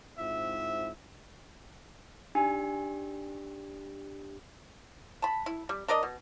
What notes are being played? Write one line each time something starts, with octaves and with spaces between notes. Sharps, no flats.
G#2 C4 E4 F4 E5
D4 D#4 G4 G#5
A5 B5
E4
G3
D4 A#4 D5 D#5
B2